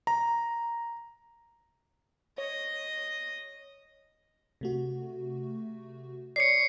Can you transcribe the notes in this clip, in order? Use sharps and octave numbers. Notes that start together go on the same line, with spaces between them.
A#5
C#5 D#5
C3 A3 F#4
C#5 D5 C7 C#7